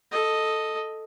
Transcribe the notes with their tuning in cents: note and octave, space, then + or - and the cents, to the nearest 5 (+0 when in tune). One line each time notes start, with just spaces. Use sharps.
A4 +0 D#5 +0